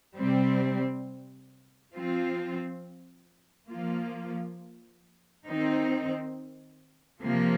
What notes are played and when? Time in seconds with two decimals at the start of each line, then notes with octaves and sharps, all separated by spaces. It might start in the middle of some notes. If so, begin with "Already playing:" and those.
0.15 C3 G3 C4
1.92 F3 C4 F4
3.69 F3 A#3 F4
5.46 D#3 C4 D#4
7.23 C3 F3 A#3